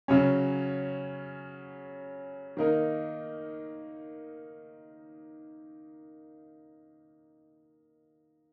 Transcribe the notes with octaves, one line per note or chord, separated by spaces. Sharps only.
C#3 F#3 C#4
D#3 A#3 D#4 A#4